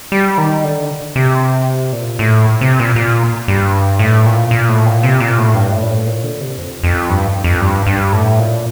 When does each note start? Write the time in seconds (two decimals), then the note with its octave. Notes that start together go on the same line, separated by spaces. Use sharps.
0.12 G3
0.38 D#3
0.64 D3
1.16 C3
1.93 A#2
2.19 A2
2.61 C3
2.80 A#2
2.96 A#2
3.48 G2
3.99 A2
4.26 A#2
4.51 A#2
4.68 A2
4.86 A#2
5.03 C3
5.20 A#2
5.38 A2
5.54 G2
5.72 A2
5.82 A#2
5.89 A2
6.06 A#2
6.24 D3
6.41 C3
6.58 F2
6.84 F2
7.10 G2
7.44 F2
7.61 G2
7.87 G2
8.13 A2
8.39 A#2